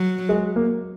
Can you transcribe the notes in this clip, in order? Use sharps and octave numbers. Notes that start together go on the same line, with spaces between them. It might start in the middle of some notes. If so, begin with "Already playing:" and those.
Already playing: F#3
G#3
A#3